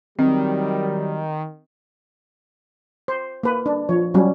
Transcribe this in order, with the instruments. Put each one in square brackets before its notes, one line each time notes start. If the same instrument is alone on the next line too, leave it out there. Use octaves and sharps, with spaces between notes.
[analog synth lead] D#3 [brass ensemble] F#3 G3 [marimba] C4
[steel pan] C5
A#3 B4
D4
F3 C#5
F#3 G3 C#4